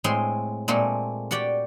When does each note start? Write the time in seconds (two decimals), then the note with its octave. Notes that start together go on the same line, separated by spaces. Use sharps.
0.04 A2 G#3 C4 C6
0.68 A#2 G#3 A3 C4
1.31 F#4 G4 D5 G5